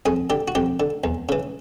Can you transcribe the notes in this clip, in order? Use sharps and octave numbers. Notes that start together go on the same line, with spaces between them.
F2 G#4
D3 G4
F#4
F2 G4
D3
E2
C#3 E3